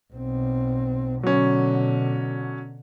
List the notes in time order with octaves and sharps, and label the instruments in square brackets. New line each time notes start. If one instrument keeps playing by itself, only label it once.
[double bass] B1 C4
[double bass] B2 D3 [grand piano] F#3 C#4